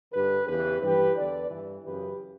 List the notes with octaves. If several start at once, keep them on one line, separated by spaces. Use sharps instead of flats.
G2 D3 G4 B4
E2 C#3 E3 G4 B4
G2 E3 G4 B4
E2 D3 B4 D5
G2 E3
F#2 C#3 E3 G4 B4